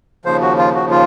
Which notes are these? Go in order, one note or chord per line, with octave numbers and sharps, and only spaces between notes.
D#2 C#3 F3 C5
F#4
F4
F#4
F4